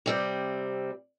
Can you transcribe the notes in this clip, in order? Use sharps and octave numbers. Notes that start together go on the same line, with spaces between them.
C3 G3 C4